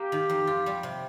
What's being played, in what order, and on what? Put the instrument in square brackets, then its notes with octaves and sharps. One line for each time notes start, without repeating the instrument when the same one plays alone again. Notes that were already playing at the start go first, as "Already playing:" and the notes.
Already playing: [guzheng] A#3 [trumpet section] G4
[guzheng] D#3
F2
F4
G3
C3